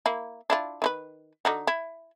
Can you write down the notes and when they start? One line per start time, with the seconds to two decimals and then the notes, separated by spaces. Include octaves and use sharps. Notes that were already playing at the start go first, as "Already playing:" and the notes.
0.06 A#3 E4
0.50 D4 E4 F4
0.82 D#3 D#4 B4
1.45 D3 D#4 F#4
1.67 E4